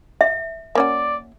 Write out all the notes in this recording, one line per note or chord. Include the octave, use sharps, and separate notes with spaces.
E5
A#3 C#4 F#4 D5